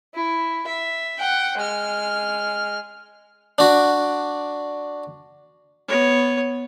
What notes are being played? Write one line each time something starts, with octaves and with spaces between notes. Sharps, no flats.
E4
E5
F#5 G5
G#3 F6
D4 F#4
B3 C#5